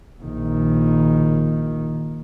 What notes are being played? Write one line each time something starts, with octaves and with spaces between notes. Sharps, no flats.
A#1 D#3